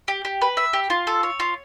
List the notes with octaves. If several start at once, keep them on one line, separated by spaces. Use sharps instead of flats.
G4
G4
B4
E5
G4
F4
A4
C#5
F4